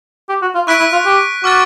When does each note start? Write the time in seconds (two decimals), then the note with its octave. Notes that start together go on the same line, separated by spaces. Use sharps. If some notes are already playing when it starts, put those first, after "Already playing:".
0.29 G4
0.42 F#4
0.55 F4
0.67 E4 C#6 F#6 B6 D7
0.79 E4
0.93 F4
1.06 G4
1.44 F#4 D6 F6 A6